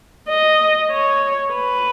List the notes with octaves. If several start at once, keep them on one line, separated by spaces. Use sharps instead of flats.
D#5
C#5
B4